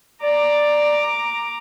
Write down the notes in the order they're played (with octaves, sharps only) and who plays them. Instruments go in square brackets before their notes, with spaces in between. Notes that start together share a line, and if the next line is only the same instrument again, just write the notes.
[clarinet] D5 [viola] A#5 D6